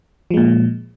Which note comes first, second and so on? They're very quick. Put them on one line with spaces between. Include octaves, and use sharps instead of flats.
F3 G#3 A#2